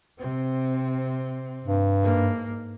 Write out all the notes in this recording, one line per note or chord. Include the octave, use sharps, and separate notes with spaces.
C3 C4
G2
G#2 A#3